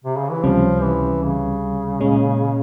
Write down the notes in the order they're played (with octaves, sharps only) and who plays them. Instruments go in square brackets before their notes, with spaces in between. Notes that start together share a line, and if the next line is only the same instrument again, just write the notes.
[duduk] C3
C#3
E3
[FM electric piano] C#2 C3 G3 C#4 [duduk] F3
[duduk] E3
C#3
[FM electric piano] A#2 G#3 C#4